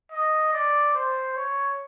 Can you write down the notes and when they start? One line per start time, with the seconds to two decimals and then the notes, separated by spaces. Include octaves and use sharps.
0.12 D#5
0.53 D5
0.94 C5
1.36 C#5